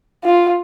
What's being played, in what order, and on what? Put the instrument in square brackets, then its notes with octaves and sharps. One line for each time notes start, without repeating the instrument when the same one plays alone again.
[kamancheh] F4